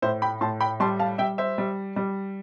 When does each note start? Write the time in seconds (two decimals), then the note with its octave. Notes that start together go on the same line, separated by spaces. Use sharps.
0.02 A2 C5 E5
0.22 G5 B5
0.41 A2 A5 C6
0.61 G5 B5
0.80 G3 A5 C6
0.99 F5 A5
1.18 G3 E5 G5
1.38 C5 E5
1.58 G3
1.96 G3